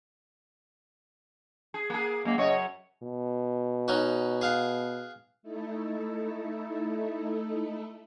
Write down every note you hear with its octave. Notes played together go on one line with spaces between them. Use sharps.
G#4
A#3 G#4
F#2 G#3 A#3
F#2 C#3 C#5 D#5
B2
C#4 D#4 F#4
G#4 F5 F#5
A3 D#4 E4 A4